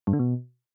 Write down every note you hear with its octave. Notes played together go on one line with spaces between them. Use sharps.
G2
D3
B2